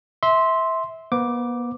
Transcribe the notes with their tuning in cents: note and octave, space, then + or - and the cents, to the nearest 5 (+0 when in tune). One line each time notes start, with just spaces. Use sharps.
E5 -20 C6 +0
B3 -45 B4 +45 D6 +0